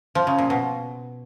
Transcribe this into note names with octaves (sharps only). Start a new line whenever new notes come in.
F3
C#3
A#2
B2